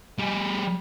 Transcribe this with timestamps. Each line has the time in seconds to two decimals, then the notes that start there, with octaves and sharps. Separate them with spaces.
0.19 G3 G#4